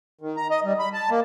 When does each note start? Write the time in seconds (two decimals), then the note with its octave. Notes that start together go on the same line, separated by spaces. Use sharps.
0.21 D#3
0.37 A#5
0.50 D#5
0.64 G3
0.79 B5
0.93 A5
1.11 A#3